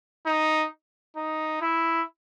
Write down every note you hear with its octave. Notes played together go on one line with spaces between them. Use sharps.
D#4
D#4
E4